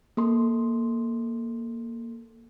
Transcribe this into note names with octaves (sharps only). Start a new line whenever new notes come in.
A#3 A4 C6